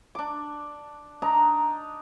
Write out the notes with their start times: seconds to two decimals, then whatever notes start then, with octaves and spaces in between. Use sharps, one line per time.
0.15 D4 D6
1.22 D4 D#4 A#5